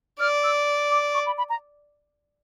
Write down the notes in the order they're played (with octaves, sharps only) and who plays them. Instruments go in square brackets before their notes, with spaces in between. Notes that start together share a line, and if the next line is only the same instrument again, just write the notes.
[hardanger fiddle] D5 [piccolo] F6
[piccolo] E6
D6
C#6
B5
B5
A#5